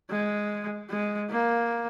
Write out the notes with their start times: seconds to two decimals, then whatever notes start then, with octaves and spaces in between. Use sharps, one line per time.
0.10 G#3
0.90 G#3
1.31 A#3